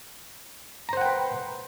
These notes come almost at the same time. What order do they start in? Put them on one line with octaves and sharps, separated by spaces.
A#5 C5 F#5 G5 B4